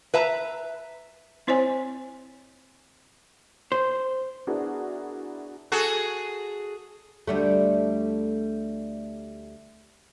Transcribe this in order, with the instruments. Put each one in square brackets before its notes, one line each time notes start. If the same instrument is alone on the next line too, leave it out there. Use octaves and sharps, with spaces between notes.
[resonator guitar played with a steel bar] B4 E5 A#5
[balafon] C4 E4 C5 C#5 D#5 G#5
[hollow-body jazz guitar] C5
[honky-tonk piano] B3 D4 E4 F#4 G#4 A#4
[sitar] F#4 G#4 A4
[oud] D2 G3 A3